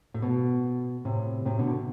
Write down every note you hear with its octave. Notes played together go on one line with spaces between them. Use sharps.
A2
B2
A2 C3
A2 C3
B2 D3